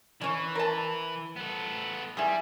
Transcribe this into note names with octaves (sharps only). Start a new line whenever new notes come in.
E3 C#4 C#5
A#4 A5
B3 A4
G3 E4 G#4